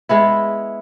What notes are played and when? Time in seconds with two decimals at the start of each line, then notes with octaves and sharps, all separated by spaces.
0.09 G#3 B3 E4